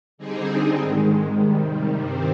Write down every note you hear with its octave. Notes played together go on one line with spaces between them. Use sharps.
D3 G3 C4 D#4 G#4
G#2 D#3 G#3
C3 D#3 G3
G2 D#3 G3 C4